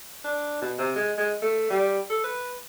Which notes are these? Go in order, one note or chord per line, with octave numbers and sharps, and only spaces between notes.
D4
B2
C3
G#3
G#3
A3
G3
A4
B4